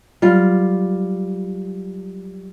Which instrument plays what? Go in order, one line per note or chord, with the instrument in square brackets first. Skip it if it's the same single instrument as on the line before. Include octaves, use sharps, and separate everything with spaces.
[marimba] F#3 [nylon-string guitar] G3 F4